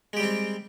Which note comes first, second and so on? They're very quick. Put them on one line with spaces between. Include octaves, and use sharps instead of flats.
G#3 G4 G3 C4